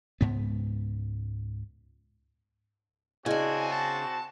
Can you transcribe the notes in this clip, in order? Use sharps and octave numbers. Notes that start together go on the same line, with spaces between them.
C#2 G#2 B3
C#3 C4 D4 E4 F#4 G#4 D#5 G#5
G#5 A5